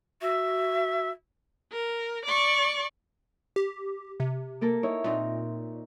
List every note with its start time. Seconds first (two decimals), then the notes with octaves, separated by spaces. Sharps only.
0.22 F#4 E5
1.72 A#4
2.26 D5 C#6
3.56 G4
4.20 C3
4.61 A#3 A4 A#4
4.83 D#4 E4 C#5
5.04 A#2 C4 D#4 A#4